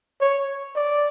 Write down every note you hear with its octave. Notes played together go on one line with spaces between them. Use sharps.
C#5
D5